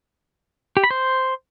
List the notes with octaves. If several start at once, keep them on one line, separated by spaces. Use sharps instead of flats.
G4
B5
C5